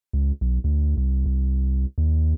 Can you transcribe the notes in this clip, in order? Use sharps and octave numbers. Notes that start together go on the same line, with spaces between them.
C#2
B1
D2
C2
C2
D#2